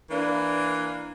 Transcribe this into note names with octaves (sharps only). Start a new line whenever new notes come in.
E3 A#3 D4